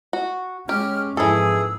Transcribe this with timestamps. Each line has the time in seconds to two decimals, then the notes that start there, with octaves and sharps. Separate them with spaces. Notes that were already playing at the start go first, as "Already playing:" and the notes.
0.13 F#4
0.69 G#3 C#4 G4 F6
1.17 F2 G#2 E3 G#4 A4 E6